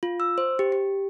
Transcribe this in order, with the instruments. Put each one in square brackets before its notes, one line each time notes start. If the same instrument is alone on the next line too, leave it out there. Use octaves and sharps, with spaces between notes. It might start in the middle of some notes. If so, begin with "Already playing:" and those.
[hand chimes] F4
E6
C5
G4
G4